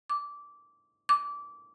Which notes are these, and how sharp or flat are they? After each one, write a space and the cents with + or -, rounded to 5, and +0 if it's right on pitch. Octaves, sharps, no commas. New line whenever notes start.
D6 -15
D6 -20